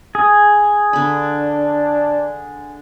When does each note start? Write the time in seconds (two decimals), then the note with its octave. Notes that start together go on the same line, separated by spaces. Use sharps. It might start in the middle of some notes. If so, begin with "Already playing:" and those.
0.15 G#4
0.93 D3 D4 B5